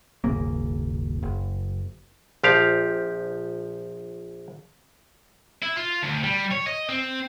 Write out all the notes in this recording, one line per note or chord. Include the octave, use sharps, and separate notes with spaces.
D#1 G#1 C#3 A#3
F#1
A#1 F3 G4 F5
E4
F4
D2
G3
C#5
D#5
C4